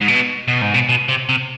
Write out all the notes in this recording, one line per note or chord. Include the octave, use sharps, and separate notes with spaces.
G#2
B2
B2
G#2
B2
B2
C3
C3